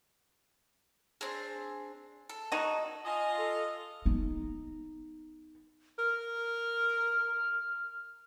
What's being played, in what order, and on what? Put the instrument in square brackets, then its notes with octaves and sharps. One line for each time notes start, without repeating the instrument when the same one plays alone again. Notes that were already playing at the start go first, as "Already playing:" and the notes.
[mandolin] C4 D4 G#4
A4
[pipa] D#4 F#4
[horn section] F4 D#5 [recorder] G#5
[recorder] A4
[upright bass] B3 D#4
[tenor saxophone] A#4 [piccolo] F6